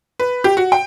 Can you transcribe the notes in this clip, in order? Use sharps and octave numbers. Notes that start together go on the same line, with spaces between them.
B4
G4
F#4
G5